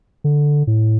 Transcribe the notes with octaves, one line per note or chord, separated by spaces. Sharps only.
D3
A2